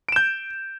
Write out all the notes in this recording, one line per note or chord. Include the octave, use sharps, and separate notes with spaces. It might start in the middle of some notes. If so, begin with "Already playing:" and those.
G6 D7 E7